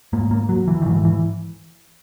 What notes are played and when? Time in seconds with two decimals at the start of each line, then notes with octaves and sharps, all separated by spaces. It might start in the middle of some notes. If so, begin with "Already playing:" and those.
0.13 G#2 A#3
0.31 A#3
0.49 F#3
0.68 E3
0.82 D#3
0.86 G#2 E3
1.05 E3